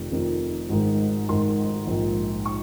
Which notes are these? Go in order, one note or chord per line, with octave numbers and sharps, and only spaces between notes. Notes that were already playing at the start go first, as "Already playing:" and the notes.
Already playing: F1 F2 C3 D#3
F1 F2 C3 D#3
G#1 G#2 D#3
G#1 G#2 D#3 C6
A#1 G#2 D#3
C#6